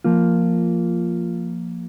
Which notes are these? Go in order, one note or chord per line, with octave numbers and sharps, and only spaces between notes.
F3 A#3 F4